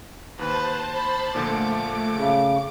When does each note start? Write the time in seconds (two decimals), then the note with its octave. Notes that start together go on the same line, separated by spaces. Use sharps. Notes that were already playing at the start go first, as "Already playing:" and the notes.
0.39 D#2 B4 C5 A5
0.94 B5
1.35 A#2 D3 F3 A3 D6
2.16 C#3